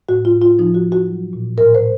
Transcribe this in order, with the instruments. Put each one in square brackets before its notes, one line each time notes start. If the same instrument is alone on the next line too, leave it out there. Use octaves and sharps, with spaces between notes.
[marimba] A2 F#4
F4
A2
F4
F3 D#4
F#4
F3
F#4
F#3
A#2
A2 A#4
C5